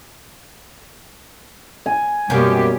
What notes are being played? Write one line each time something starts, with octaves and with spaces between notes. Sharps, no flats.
G#5
F#2 B2 G3 A#3 G4